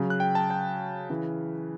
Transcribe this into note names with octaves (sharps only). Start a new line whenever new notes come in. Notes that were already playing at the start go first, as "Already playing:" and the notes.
Already playing: C#3 F#3
F#6
G5
A5
G5
C#3 E3